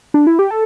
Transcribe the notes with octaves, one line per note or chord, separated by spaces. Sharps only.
D4
E4
G4
A4